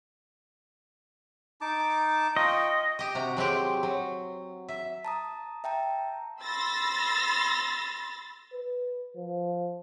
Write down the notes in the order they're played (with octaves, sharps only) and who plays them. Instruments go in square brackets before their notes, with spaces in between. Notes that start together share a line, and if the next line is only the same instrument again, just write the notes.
[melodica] D#4 A5 D6
[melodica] F4 G5 C#6 [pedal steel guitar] D#5
[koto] G4 D#5
C3 F#4 A#5
F#3 G#3 C4 G4
F#3
E5
[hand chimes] A5 A#5 D#6
E5 G5 A5 A#5
[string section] B5 C6 E6 A6 A#6
[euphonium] B4
F3